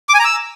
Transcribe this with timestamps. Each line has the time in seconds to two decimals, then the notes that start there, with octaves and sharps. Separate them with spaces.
0.09 D6
0.14 G#5
0.19 A#5
0.25 E6